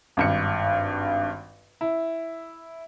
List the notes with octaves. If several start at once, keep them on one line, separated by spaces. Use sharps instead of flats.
G#1 G2 C#7
E4